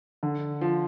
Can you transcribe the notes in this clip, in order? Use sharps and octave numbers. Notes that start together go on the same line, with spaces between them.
D3
F3